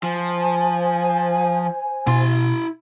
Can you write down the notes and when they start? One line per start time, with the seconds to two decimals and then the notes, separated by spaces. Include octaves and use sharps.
0.03 F3 C5 G#5
2.07 B2 E4 C6